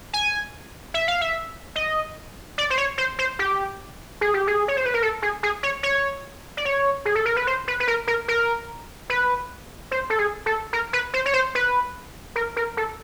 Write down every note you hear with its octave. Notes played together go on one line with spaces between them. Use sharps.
G#5
E5
F5
E5
D#5
D5
C5
C#5
C5
C5
G4
G#4
G4
G#4
C#5
C5
B4
A#4
A4
G#4
G#4
C#5
C#5
D5
C#5
G#4
A4
A#4
B4
C5
B4
B4
A#4
A#4
A#4
B4
C5
A4
G#4
A4
A#4
B4
C5
C#5
C5
B4
A#4
A#4
A4